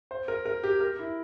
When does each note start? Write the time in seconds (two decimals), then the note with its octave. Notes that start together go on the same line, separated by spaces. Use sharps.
0.11 C5
0.28 A#4
0.46 A#4
0.63 G4
0.80 A#4
0.99 E4